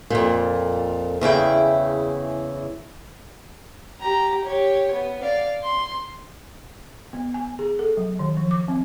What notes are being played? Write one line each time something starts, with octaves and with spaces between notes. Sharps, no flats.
F2 A#2
E2 C#3 E4 G5
G4 A#5
G4 C#5
B3
D5 F5
C6
B3
G#5
G#4
A4
F#3
D#3
F3
D6
C4